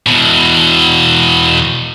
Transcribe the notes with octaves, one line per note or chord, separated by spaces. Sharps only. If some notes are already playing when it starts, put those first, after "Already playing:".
E2 B2